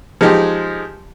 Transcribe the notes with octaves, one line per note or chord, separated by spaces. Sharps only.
F3 G#3 D#4 G4